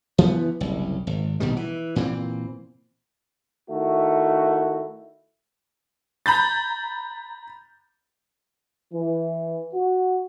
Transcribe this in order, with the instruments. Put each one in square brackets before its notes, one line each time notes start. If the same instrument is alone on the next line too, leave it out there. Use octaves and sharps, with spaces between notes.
[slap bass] E3 F3 A3 B3
F#1 C2
G#1
A#1 B2 D#3 G3
E3
A#2 E3 C4
[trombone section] D#3 A3 E4 F#4
[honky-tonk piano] A#5 B5 G6 A6
[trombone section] E3
F#4